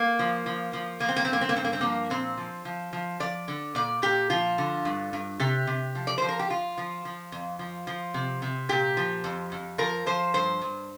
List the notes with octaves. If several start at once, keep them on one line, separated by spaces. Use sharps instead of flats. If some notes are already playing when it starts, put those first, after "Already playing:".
Already playing: A#3
F3
F3
F3
F3 A#3
C4
A#3
C4
G2 A#3
C4
A#3
G2 C4
A#3
C4
F3 A#3
A#2 C4
F3
F3
F3
F3 D5
D3
A#2 D5
A#2 G4
F3 F4
D3
G2
G2
C3 G4
C3
F3
D5
F3 C5
A#4
G4
F3 F4
F3
F3
F2
F3
F3
C3
C3
A#2 G4
F3
F2
F2
F3 A#4
F3 C5
G2 C5
G2